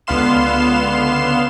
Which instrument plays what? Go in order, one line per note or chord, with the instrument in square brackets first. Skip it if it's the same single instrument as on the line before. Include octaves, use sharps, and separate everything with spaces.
[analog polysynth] C#2 D3 B3 F5 C6 E7